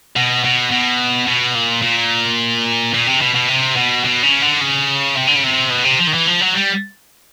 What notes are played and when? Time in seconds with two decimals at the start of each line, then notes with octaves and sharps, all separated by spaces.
0.16 B2
0.44 B2
0.71 B2
1.27 B2
1.55 A#2
1.82 A#2
2.94 A#2
3.07 C3
3.22 B2
3.35 B2
3.49 C3
3.77 B2
4.05 B2
4.23 C#3
4.42 D3
4.61 C#3
5.16 C3
5.27 D3
5.36 C#3
5.44 C3
5.71 B2
5.85 C3
5.99 F3
6.07 D#3
6.14 E3
6.27 F3
6.41 F#3
6.55 G3